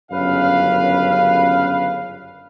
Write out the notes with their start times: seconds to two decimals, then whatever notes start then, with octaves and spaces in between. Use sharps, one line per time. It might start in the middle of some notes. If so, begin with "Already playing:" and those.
0.12 G1 F#2 C#3 B4 F5